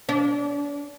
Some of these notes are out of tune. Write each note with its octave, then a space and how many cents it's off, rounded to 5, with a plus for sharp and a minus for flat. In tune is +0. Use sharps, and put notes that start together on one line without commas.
D4 -35